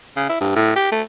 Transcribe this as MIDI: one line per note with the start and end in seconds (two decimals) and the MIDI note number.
0.16 0.26 49
0.29 0.40 64
0.41 0.51 43
0.56 0.74 45
0.76 0.91 67
0.92 1.02 57